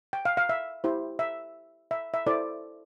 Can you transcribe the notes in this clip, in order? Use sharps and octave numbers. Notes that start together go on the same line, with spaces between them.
G5
F5
F5
E5
E4 G4 C5
E5
E5
E5
E4 A4 C5 D5